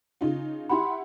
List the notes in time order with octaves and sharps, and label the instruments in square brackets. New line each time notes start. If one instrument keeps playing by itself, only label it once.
[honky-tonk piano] C#3 D#4 F4
[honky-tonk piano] E4 G4 F#5 [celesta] B5 C6